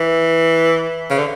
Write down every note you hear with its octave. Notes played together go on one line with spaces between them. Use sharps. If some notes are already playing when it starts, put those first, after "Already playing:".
Already playing: E3
C#3
D3